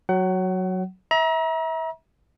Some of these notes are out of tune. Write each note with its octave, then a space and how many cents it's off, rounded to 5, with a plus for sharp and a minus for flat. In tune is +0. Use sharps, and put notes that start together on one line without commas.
F#3 +0 F#5 +30
E5 -30 A#5 +35